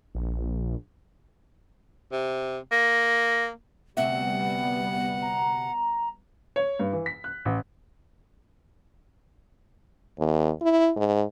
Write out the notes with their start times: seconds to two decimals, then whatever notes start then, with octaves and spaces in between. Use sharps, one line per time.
0.15 A#1
2.12 C3
2.72 A#3 A#6
3.97 D2 C3 G3 B3 E5 F#5
5.22 A#5
6.56 C#5
6.79 G2
6.93 E3
7.06 B6
7.24 F#6
7.45 A1
10.19 D#2
10.61 E4
10.96 G#2